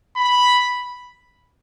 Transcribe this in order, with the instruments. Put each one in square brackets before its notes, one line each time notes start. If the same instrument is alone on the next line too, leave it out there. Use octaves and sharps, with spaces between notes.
[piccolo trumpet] B5